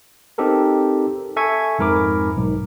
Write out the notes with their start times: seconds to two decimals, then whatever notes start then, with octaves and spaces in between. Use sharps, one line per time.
0.38 C4 D#4 G4 A4 A#4
1.36 A4 E5 G#5 C#6 G#6
1.79 F2 G#2 A#4 B5 D6
2.36 B1 G#2